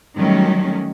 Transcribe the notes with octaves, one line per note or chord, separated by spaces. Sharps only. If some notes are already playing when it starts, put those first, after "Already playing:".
D#3 F#3 G3 A3 C#4